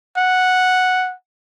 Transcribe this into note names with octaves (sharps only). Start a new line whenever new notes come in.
F#5